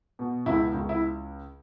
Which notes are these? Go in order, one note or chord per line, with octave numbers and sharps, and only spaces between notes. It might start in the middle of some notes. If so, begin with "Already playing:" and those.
B2
C#2 E4
C#2
E4